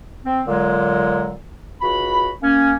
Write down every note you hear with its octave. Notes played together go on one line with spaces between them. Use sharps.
C4
A#2 D3 F#3 G#3
C#2 F#4 B5
A#3 C#4